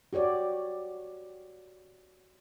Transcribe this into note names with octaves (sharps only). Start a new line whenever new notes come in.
F#4 G4 C#5 D5